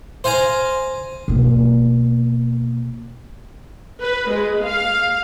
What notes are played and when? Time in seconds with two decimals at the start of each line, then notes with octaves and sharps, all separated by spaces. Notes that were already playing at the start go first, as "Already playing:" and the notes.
0.24 C5 F5 G#5 A#5
1.28 B2 A#3
4.02 B4
4.31 G#3
4.64 F5